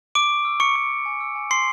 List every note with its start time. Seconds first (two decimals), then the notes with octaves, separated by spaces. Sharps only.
0.15 C#6 D6 D7
0.30 C#6
0.45 E6
0.60 C#6 C#7
0.75 C#6
0.91 C#6
1.06 G#5
1.21 E6
1.35 G#5
1.51 C6 C7